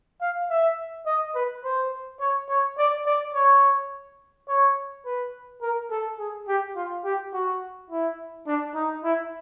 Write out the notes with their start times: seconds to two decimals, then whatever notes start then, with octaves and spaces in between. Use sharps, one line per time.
0.21 F5
0.50 E5
1.06 D#5
1.35 B4
1.64 C5
2.20 C#5
2.49 C#5
2.78 D5
3.06 D5
3.34 C#5
4.48 C#5
5.06 B4
5.62 A#4
5.91 A4
6.19 G#4
6.48 G4
6.76 F4
7.04 G4
7.33 F#4
7.90 E4
8.47 D4
8.75 D#4
9.04 E4